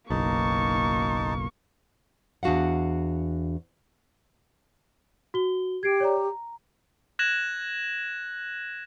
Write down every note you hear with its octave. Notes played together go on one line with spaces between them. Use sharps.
F#1 B1 A#3 D#4 A5 C#6
E2 D4 F#4 F5 F#5
F#4 G7
G4 G#6 C7 D7
C#5 D5 A#5
A#5
F#6 G#6 A#6 E7 F#7